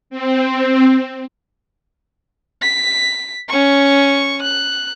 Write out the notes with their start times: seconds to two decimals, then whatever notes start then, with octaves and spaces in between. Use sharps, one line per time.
0.10 C4
2.61 B6
3.49 C#4 C#6
4.42 F#6